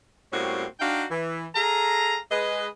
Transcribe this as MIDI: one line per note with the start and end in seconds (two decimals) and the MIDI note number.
0.32 0.65 45
0.32 0.65 55
0.32 0.65 58
0.32 0.65 60
0.32 0.65 61
0.32 0.65 66
0.80 1.04 62
0.80 1.04 63
0.80 1.04 66
0.80 1.04 77
0.80 1.04 79
1.11 1.46 52
1.55 2.17 68
1.55 2.17 69
1.55 2.17 77
1.55 2.17 82
2.31 2.67 56
2.31 2.67 71
2.31 2.67 75